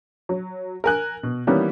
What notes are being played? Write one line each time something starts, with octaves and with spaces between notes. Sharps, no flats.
F#3
A#4 G#5 F#6
B2
D#3 E3 G3 A#3 B3 C#4